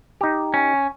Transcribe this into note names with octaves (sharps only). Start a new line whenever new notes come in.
D#4 G4
C#4